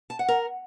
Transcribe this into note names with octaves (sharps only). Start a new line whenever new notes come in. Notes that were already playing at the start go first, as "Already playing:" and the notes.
A5
F#5
A#4